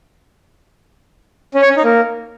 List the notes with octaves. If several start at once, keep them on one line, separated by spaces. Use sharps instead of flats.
C#4
C#5
C#4
D#4
A#3